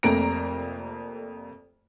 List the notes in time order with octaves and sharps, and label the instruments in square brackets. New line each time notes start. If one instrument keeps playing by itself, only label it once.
[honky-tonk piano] F1 F2 A3 A#3 A#5 D7